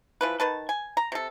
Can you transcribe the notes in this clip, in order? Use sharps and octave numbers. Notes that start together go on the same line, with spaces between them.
E3 F3 B4
D#3 B4 A5
G#5
A#5
C3 A4